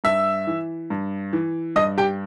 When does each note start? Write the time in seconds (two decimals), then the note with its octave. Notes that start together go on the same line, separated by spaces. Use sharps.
0.04 G2 E5 E6
0.47 E3
0.90 G2
1.33 E3
1.76 G2 D#5 D#6
1.98 G4 G5